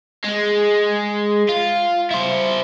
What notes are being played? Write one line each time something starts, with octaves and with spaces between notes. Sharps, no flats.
G#3
F4
E4 C5